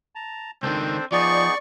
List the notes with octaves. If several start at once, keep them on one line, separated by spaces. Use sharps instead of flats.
A5 A#5
C#2 D#3 C4 D4 A4 C5
F3 B3 D#4 G#4 D5 C#6